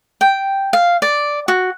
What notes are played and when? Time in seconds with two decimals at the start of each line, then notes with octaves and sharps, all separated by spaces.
0.21 G5
0.73 F5
1.02 D5
1.48 F#4